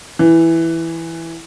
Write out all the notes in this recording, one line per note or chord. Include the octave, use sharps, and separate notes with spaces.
E3